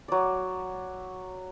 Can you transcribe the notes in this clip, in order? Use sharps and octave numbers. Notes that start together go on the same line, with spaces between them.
F#3 D5